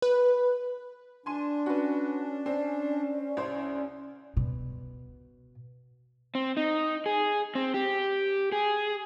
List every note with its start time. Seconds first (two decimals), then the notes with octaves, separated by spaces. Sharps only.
0.02 B4
1.26 D4 G#5 C6 D#7
1.66 C#4 F#4 B4
2.46 C4 D5
3.37 C2 C5
4.37 B2
6.35 C4
6.57 D#4
7.06 G#4
7.55 C4
7.74 G4
8.52 G#4